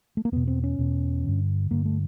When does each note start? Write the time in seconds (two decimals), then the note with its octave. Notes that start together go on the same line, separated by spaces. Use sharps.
0.17 A3
0.25 A#3
0.32 E2 B2 B3
0.47 C4
0.64 C#4
0.78 E2 B2
1.24 G2 D3
1.71 G2 D3 A#3
1.85 A3